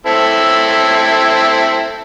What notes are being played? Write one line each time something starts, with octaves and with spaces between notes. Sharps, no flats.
C4 E4 A4